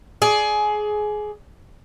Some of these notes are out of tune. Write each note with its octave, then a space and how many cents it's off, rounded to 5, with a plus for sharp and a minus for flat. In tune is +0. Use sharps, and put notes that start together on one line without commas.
G#4 +20 D5 +0